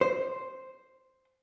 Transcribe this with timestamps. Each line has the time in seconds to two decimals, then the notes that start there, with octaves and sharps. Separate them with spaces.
0.01 C5